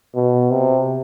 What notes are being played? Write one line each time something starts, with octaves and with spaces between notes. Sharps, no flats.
B2
C3